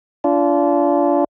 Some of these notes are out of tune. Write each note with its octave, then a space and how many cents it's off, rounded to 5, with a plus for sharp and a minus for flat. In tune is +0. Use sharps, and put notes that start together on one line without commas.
D4 -30 F4 -20